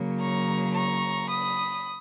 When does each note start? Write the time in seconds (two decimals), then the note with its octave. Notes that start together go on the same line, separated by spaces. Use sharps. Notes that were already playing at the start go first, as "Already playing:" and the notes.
Already playing: C#3 F#3 A#3
0.21 A#5 C#6
0.75 A#5 C#6
1.30 B5 D#6